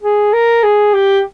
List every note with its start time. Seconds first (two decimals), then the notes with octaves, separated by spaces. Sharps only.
0.02 G#4
0.33 A#4
0.63 G#4
0.93 G4